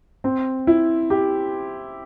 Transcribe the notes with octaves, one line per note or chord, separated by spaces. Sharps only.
C4
E4
G4